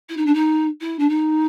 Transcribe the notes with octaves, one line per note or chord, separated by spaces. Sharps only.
E4
D#4
D4
D#4
E4
D4
D#4